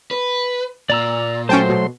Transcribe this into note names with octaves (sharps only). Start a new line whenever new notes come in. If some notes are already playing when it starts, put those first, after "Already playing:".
B4
A#2 D5 A#5 E6
F#3 A3 C#4 C5 G5 A5 C6
B2